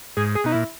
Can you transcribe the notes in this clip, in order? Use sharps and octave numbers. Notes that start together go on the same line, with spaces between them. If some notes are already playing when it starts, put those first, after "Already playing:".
G#2 G#4
G#4
B2 D#4
A#2 E4